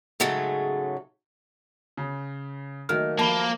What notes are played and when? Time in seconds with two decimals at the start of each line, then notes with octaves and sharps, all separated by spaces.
0.20 G#2 C#3 F#3 G#3 A3
1.97 C#3
2.89 D#3 F#3 A3 A#3 F6
3.19 F3 A#3 A5 B5 G7